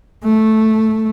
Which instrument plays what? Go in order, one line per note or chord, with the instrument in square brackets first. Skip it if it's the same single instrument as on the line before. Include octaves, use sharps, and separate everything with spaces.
[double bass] A3